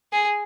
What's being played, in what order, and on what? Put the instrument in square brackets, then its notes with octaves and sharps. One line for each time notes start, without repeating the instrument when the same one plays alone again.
[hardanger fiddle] G#4